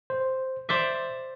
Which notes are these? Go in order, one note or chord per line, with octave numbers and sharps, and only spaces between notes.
C5
C5 D5 E5 D6